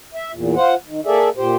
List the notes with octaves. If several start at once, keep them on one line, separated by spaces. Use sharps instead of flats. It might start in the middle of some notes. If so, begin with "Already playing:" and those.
E5
E2 A#2
F4 C5 F#5
D#3
A#3 G#4 A4 D5 E5
A#2 G4 C5